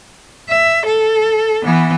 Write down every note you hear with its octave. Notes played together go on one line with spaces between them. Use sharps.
E5
A4
E3 B3